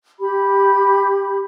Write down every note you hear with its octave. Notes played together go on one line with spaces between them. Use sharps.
G4 B5